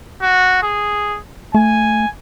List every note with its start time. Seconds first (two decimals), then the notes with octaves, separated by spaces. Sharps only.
0.22 F#4
0.63 G#4
1.55 A3 G#5